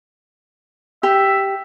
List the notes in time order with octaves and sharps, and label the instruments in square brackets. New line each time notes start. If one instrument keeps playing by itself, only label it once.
[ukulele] G4 [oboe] E5